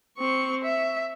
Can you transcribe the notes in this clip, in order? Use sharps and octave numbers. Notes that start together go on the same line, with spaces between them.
C4 C#6
E5